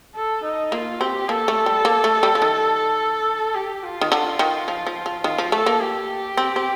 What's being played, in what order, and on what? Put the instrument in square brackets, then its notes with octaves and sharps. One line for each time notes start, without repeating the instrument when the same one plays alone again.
[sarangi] A4
D#4
[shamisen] A#3 [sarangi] F4
[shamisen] C4 [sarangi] G4
[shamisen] A#3 [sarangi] A4
[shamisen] A3
G3
A#3
A3
G3
F3
D#3
[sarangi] G4
F4
[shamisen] D#3
D3
D#3
F3
F3
F3
[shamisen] D#3 [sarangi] F4
[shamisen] F3
[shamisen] A3 [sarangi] A4
[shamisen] A#3
[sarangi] G4
[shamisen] C4
C4